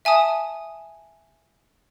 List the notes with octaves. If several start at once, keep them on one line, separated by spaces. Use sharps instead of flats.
E5 G#5 A5 D#6